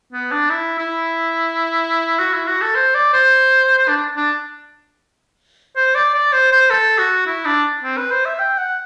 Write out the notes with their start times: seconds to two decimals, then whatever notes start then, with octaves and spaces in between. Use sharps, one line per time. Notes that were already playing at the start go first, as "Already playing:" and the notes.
0.13 B3
0.31 D4
0.50 E4
0.78 E4
2.19 F#4
2.34 E4
2.47 F#4
2.62 A4
2.75 C5
2.95 D5
3.13 C5
3.88 D4
4.17 D4
5.76 C5
5.95 D5
6.14 D5
6.32 C5
6.52 C5
6.70 A4
6.98 F#4
7.27 E4
7.46 D4
7.83 C4
7.97 B4
8.11 C5
8.25 E5
8.39 G5
8.58 F#5